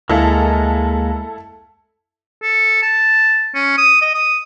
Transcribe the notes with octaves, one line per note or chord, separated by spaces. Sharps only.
D2 G#3 A#3 E4 A4 F5
A4
A5
C#4
D#6
D#5
D#6